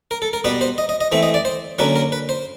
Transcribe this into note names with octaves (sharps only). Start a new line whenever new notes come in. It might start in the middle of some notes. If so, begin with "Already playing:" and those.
A#4
A4
A#4
B2 G3 B3 B4
C5
D#5
D#5
D#5
E3 A3 C4 E5
D#5
D5
C5
D3 F#3 A#3 C#4 B4
A#4
B4
C5